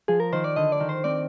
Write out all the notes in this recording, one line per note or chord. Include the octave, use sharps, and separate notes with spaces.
F3 G#4
A#4
D#3 C5
D5
D3 D#5
D5
D#3
C5
C4 D5